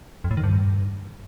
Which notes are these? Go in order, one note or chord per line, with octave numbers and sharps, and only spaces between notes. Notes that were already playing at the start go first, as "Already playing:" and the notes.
F2
A2
D#3
G2